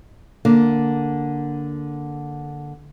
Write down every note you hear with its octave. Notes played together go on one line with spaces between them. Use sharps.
D3 A#3